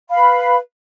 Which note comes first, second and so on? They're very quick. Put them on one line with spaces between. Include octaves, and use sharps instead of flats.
F5 B5 B4